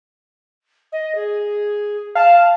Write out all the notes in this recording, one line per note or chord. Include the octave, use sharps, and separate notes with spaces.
D#5
G#4
F5 A5